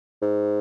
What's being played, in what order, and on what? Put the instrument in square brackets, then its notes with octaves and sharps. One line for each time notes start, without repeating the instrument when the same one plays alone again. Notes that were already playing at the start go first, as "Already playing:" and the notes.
[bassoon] G#2